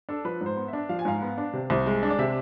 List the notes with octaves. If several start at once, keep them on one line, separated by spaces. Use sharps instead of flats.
D4 A4
F3 B4
G#2
C5
B3
E5
D4
F3 F5
G#5
G#2 F5
B3
D4
C3
C2
G#3
D4
D5
C3 E5